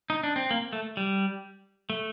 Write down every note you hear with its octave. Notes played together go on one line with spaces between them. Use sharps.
D#4
D4
C4
A#3
A3
G3
A3